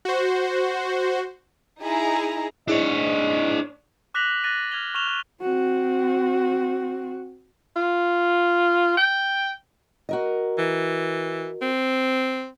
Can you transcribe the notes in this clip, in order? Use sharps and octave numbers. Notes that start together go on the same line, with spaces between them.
F#4 C5
D#4 E4 G#4 A#5
G#2 D4 E4 G#4 C#5 D#5
D6 F#6 A#6 B6 F7 F#7
F#6 A6 A#6 D#7
F6 G#6 F7 G7
C#6 F6 A#6 E7 F7 G7
F#6
C4 F#4
F4
G5
F#4 A#4 D#5
E3
C4